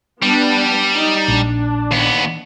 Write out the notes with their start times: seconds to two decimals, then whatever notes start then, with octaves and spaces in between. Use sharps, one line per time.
0.22 G3 B3 D4
0.96 D#4
1.28 A#1 D4
1.91 D#2 B3